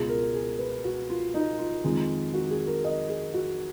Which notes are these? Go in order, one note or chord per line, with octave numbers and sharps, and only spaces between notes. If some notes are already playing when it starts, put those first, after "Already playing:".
Already playing: C#2 B2 G#3 G#4
A#4
G#4
B4
F#4
F4
D#4
F4
F2 D#3 G#3
F#4
G#4
A#4
D#5
G#4
F#4